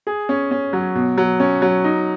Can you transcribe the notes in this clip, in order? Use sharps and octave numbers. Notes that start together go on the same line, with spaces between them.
G#4
C#4
C#4
F#3
B2
F#3
C#4
F#3
D#4